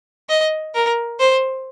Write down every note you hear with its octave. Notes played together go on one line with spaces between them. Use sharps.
D#5
A#4
C5